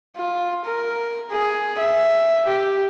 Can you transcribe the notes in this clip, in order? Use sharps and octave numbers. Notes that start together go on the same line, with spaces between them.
F4
A#4
G#4
E5
G4